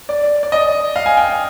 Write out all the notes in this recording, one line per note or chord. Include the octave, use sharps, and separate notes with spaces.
D5
D5
D#5
F5
G#5
G5